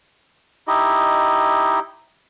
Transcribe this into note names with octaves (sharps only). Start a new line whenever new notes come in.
D#4 E4 G4 D#5